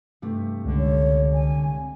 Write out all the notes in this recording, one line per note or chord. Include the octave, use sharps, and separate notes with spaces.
G2 C3 A3
C#2 D3
C#5
G#5